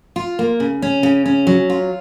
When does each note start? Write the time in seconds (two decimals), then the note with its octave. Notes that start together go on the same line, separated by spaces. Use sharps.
0.16 F4
0.39 A#3
0.60 C#3
0.82 C#4
1.03 C#3
1.26 C#4
1.47 F#3
1.70 F4